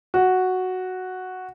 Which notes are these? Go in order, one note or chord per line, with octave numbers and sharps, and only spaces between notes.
F#4